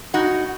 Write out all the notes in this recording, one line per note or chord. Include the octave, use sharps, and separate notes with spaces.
A2 D#4 F#4